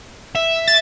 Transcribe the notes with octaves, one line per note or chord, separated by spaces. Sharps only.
E5
A6